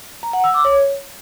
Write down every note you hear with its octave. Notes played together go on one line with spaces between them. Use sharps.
A#5
F#5
E6
D6
C#5